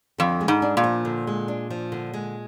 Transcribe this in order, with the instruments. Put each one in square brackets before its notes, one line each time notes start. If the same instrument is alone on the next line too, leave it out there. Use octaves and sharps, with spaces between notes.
[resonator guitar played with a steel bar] F2 [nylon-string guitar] D3
[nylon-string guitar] G#3
[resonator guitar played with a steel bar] G#2
[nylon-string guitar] D4
[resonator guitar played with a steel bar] A#2
[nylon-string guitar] F3
D3
G#3
D4
F3
D3
G#3